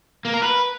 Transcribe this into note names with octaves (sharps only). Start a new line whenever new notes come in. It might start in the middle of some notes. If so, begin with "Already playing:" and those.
A#3
A#4
B4